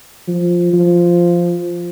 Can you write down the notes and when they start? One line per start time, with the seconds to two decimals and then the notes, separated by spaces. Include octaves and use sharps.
0.28 F3
0.73 F3